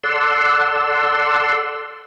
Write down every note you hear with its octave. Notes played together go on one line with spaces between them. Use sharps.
A4 D5 F#5 C6 E6